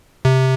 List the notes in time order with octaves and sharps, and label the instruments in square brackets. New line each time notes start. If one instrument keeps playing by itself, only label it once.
[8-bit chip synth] C3